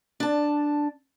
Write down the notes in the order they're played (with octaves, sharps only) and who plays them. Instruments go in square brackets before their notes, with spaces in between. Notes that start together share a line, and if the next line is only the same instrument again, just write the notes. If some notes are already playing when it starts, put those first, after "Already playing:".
[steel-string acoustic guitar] D4 A5